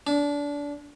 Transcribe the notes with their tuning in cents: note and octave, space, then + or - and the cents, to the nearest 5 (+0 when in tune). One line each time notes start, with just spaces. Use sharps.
D4 -25